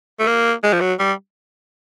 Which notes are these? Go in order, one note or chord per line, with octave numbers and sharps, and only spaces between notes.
A3
A#3
G#3
F3
F#3
G3